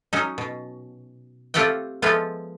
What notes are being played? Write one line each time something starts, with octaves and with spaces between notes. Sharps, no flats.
F#3 C#4 D#4
B2
A3 C4 F4 G4 F#5 G5
F3 G#3 A3 B3 F4